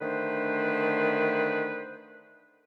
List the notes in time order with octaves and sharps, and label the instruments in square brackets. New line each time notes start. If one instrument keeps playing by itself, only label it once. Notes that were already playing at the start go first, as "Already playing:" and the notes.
[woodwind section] D3 D#3 A3 D4 B4 C5